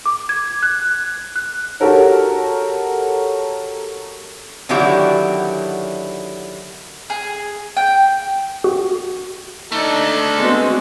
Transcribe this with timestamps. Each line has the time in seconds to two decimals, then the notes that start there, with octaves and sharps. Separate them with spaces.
0.06 D6
0.29 G#6
0.63 F#6
1.36 F#6
1.80 F#4 G4 A4 A#4 C#5
4.69 D3 D#3 F#3 E4 F#4 G4
7.10 G#4
7.77 G5
8.64 F#4
9.72 A3 D4 D#4 A4
10.38 G#3 B3 C4 F#4